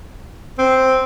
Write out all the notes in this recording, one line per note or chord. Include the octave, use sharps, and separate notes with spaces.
C4